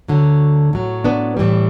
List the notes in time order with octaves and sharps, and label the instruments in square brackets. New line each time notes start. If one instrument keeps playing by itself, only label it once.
[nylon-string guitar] D2 D3 F#3
A2 F#3
B3 D4
A2 E3 G3